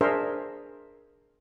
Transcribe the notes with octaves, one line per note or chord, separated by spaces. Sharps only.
D4 G#4 A#4 C5 E5